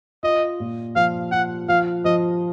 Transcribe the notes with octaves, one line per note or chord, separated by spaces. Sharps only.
F4 D#5
A#2
F3 F5
F4 F#5
F3 F5
F3 D#5